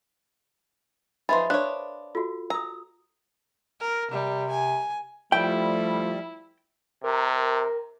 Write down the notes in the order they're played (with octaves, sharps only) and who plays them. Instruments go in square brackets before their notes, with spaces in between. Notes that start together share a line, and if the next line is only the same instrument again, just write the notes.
[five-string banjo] F3 D#4 G#4 [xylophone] B4 E5 A6 [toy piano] B5 C6
[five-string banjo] D4 C#5 [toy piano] A4 C5 F5 [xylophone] F#6
[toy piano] F4 F#4 [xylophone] A4
[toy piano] A#4 D#6 [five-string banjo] A#5
[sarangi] A#4
[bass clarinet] C3 [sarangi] G3
[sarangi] G#5
[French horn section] F3 A3 [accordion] G3 [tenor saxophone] E4 [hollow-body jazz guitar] G5
[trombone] C3 [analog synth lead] A#4